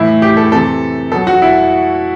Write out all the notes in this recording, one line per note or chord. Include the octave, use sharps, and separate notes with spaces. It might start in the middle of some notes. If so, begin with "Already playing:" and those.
Already playing: A2 E3 E4
G4
A4
C3 E3 A4
B2 F#3 A4
F#4
E4